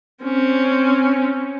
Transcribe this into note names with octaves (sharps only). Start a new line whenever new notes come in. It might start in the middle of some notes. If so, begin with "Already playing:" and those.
C4 C#4